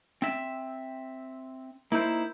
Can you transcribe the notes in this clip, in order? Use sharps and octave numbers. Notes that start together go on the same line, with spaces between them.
C4 E5
A#3 D#4 E4 C5